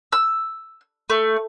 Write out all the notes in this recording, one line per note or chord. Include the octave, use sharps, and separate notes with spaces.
E6
A3